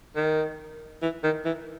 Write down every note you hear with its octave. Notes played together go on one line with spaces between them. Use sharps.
D#3
E3
D#3
E3